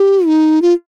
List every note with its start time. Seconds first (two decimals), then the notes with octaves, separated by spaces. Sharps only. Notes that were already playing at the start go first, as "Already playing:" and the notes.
Already playing: G4
0.27 D#4
0.62 F4